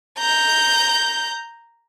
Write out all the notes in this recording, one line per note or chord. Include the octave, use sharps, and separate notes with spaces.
A#5 G6